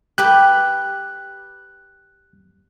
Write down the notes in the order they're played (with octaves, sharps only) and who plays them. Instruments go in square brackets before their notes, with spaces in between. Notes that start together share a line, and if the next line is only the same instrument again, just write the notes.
[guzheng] G4 B4 [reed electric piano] F#6